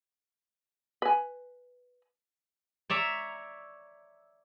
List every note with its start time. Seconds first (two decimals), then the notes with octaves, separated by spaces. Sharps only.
1.02 B4 G#5
2.90 C#5 D5 E5 A#5